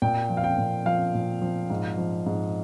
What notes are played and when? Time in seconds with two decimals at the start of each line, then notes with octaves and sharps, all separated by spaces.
0.02 A#2 G5
0.29 F3
0.37 F5
0.44 G5
0.58 A#2
0.86 F3 F5
1.14 A#2
1.42 F3
1.70 G#2
1.98 F3
2.26 G#2